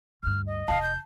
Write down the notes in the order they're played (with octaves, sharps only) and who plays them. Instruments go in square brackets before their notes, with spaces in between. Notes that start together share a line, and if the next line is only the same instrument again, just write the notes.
[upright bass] D2 G2 [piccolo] F6
[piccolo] D#5
[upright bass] F1 E2 [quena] F5 [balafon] A5
[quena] G6